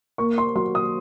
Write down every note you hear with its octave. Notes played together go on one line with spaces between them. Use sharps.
A#3 C#6
C6
F#3 C6
D#6